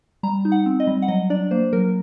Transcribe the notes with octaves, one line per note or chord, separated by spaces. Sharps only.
G3 A#5
D#4
F#5
C4
D#5
G3
F#5
F#3 D#5
D4 D5
A#3 C5
F#3 A#4